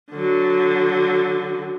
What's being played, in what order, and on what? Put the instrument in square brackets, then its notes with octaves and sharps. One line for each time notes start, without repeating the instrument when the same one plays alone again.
[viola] D3 F#3